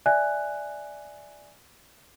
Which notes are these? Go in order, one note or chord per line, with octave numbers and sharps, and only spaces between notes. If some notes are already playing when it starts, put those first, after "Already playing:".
D5 E5 G#5 F#6